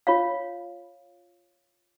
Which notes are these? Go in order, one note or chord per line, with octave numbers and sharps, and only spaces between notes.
F4 C#5 F5